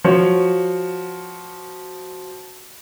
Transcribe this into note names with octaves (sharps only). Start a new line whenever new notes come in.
F3 F#4 C#5